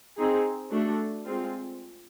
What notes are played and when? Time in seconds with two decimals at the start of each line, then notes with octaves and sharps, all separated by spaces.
0.18 C4 D#4 G#4
0.71 A3 D4 F#4 A4
1.26 G#3 C4 F4